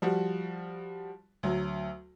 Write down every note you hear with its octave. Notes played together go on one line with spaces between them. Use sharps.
F3 G3 F#4
D2 F#3